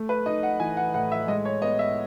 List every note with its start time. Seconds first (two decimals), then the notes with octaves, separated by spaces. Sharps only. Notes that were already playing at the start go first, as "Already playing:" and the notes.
Already playing: A3
0.09 B4
0.26 D#4 D#5
0.43 F#5
0.60 E3 G#5
0.77 F#5
0.94 A2 F#5
1.12 E5
1.28 G#3 D#5
1.45 C#5
1.62 B3 D#5
1.79 E5